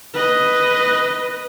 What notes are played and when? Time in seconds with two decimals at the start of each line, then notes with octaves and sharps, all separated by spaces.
0.14 B4 D#5